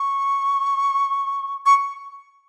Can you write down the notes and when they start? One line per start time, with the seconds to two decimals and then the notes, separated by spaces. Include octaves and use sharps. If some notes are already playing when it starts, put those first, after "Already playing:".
Already playing: C#6
1.66 C#6